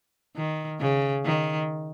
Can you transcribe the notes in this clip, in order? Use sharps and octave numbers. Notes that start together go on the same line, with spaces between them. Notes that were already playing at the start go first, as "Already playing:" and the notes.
D#3
C#3
D#3